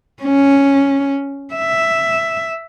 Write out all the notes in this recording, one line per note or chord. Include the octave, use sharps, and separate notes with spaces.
C#4
E5